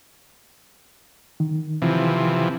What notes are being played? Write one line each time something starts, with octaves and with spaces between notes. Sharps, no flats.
D#3
C3 E3 F3